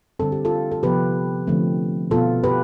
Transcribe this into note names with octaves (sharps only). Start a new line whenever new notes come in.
D3 G3 C4 A4
G4
F4 A4
A4
C3 F3 B3 G4 B4
D3 F3 A3 C4
B2 B3 F4 A4
G4 B4